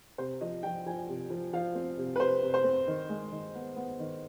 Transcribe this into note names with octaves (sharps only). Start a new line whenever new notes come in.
C3 C5
F3 D#5
F3 G5
F3 G#5
C3
F3
F3 F5
C4
C3
B4
C3 C5
C3
C5
C4
D#3
G#3
D#3
B3
B3
D#3